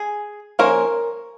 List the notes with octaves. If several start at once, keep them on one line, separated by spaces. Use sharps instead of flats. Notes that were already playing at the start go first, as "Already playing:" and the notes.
Already playing: G#4
F3 A#3 C#4 A#4